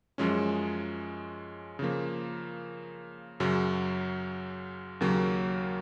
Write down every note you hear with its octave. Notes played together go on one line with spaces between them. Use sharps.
F#2 F3 G#3 C#4
C#3 F3 A#3
F#2 C#3 F#3
D#2 C#3 F#3 A#3